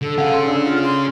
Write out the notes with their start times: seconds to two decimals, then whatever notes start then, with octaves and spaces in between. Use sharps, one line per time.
0.02 D3 A4
0.18 C#4 G#4 F5 F#5
0.34 C6
0.47 D4
0.65 F4
0.84 C6